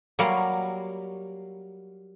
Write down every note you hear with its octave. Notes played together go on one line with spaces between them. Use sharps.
F#3 G3 A#3 A#4 B5 C6